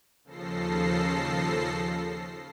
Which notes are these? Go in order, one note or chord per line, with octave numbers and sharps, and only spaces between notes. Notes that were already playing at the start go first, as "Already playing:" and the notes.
D#2 C#3 F3 A4 A#6 C7